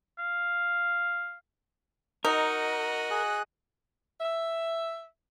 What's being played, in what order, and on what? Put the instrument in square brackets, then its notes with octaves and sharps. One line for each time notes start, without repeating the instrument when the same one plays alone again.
[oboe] F5
[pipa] D#4 [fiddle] F#4 D#5 [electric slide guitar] A#4
[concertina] G#4 F#6
[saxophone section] E5